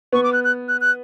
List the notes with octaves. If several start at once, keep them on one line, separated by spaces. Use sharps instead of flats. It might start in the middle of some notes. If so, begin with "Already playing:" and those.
B3 C#6
D6
F#6
F#6
F#6
F#6